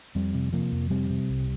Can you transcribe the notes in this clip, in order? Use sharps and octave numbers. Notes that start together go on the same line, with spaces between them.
F2 G3 C4
C3
C3 F3 A#3
F2
C3 G3 C4
C3
C2